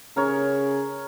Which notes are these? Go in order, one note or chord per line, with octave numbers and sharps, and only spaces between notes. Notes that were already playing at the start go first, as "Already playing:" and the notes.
C#3 A#4 C#5